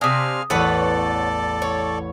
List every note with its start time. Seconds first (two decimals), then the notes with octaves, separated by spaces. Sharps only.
0.01 C3 D4 F5 G#5 D#6 F6 A#6 B6
0.50 A1 E2 A4 B4 C#5 D5 F#5
1.62 C#5